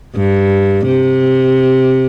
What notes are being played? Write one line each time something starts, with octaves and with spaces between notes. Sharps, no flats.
G2
C3